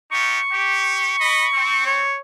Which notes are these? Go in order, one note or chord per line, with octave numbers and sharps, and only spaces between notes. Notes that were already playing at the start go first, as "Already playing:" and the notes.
D#4 F4 G4 C#6
G4
D#5 B5
C4
C#5